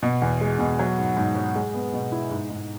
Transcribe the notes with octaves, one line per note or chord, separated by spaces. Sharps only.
B2
E2
G#3
B2
F#3
G#2
G#2
F#3
G#3
B3
B2
E4
G#2
G#2